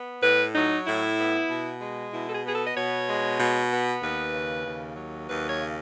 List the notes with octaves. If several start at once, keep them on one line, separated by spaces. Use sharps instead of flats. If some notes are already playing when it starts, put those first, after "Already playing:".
Already playing: B3
A2 B4
F#3 D#4
A2 E4
B3
B2
G#3
B2 E4
A4
G#4
B3 G#4
A4
D#5
B2 C#5
G#3
B2
B3
D#2 B4
C#3
D#2
F#3
D#2 B4
C#5
C#3